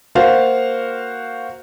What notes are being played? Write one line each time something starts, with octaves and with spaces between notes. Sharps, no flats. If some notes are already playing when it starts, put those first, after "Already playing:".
A#3 F#4 C5 F5